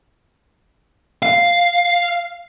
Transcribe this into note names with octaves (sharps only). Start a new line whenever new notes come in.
F5